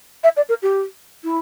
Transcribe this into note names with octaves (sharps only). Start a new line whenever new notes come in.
E5
D5
A#4
G4
E4